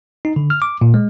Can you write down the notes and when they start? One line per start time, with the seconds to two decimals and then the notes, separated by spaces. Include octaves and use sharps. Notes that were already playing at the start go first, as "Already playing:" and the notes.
0.25 D#4
0.36 D3
0.50 F6
0.62 D6
0.81 A#2
0.94 G#3